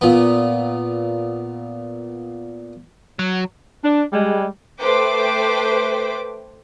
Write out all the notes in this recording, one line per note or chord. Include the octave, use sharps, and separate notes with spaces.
A#2 B3
F#3
D4
G3 G#3
A3 B4 C5 G5 D6